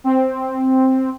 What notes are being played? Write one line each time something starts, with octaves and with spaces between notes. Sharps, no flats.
C4